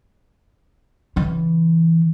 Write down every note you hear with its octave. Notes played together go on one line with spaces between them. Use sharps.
C#3 E3